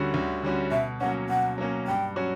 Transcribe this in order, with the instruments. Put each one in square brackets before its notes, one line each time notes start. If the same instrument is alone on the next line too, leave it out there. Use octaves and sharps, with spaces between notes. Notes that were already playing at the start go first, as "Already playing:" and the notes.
Already playing: [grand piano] D2 D3 G3 C#4 F#4
D2
D3 G3 C#4 F#4
[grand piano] B2 [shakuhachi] E5
[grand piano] F#3 A#3 C#4 [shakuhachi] F#5
[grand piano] B2 [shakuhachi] F#5
[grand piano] F#3 A#3 C#4
[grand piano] G2 [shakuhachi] G5
[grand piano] F#3 C#4 F#4